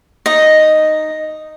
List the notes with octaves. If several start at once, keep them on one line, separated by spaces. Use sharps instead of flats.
D#4 D#5